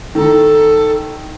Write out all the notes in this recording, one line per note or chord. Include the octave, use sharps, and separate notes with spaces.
D#3 A4 A#5